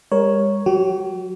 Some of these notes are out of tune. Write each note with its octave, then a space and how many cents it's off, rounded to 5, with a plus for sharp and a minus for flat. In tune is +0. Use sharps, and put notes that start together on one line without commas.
G3 +45 A#4 +10 C#5 +0
F#3 -10 G4 -45